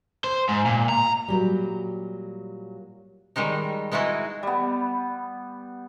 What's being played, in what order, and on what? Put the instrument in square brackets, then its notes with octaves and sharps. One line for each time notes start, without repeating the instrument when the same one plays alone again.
[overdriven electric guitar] C5
G#2
A#2
A#5
[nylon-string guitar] A#2 F#3 G3
[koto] D#3 G3 G#3 D#4
G#3 D#4 E4 F#4 G#4
[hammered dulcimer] G3 B3